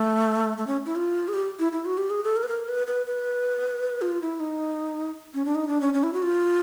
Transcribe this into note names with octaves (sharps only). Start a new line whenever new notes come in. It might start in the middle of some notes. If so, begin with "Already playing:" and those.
Already playing: A3
A3
C#4
E4
F4
G#4
G4
E4
E4
F#4
G4
G#4
A4
A#4
B4
A#4
B4
B4
B4
F4
E4
D#4
C#4
D4
D#4
D4
C#4
C#4
E4
F#4
F4